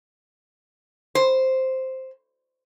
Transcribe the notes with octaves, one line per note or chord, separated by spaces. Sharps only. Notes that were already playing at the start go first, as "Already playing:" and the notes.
C5